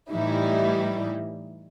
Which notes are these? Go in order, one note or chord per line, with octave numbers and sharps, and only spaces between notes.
A2 E3 G3 D#4 E4